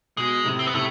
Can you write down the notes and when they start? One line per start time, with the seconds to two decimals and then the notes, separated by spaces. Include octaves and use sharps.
0.17 B2 G#3
0.45 A2 C3
0.59 C4
0.67 B3
0.73 A2 C3 A3